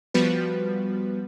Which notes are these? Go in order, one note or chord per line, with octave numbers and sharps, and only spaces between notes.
F3 G3 B3 F#4 B4